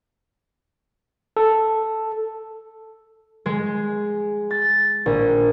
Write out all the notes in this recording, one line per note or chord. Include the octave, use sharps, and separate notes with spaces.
A4
G#3
A6
A#1